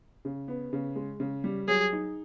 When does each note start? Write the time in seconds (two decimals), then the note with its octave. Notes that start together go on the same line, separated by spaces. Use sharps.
0.25 C#3
0.48 B3
0.73 C#3
0.96 G#3
1.20 C#3
1.44 G3
1.67 F#3 G#4
1.93 D#4